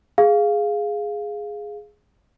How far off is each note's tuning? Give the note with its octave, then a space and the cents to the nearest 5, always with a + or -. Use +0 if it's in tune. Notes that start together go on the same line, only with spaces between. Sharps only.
G#4 +0 F5 +0